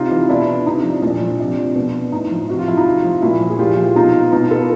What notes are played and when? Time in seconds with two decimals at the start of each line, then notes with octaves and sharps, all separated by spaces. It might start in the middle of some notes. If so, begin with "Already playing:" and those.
Already playing: C3 D#4 F4
0.11 E3
0.29 B2 D4 E4
0.66 C3 D#4
0.84 F3
1.02 A#2 D4
1.21 F3
1.39 C3
1.58 F3
1.75 B2
2.12 A2 D#4
2.31 F3
2.49 C3 F#4
2.59 F4
2.68 F3 E4
2.77 D#4 F4
2.86 C3
3.04 F3
3.22 A#2 E4 F#4
3.41 F3
3.50 G#4
3.59 A#2 F4 G4
3.77 F3
3.95 B2 D#4 F4
4.32 B2 D#4 F4
4.51 A4 B4